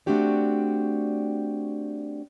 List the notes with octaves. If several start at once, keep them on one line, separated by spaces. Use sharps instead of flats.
A3 C4 D4 F#4 G4 D5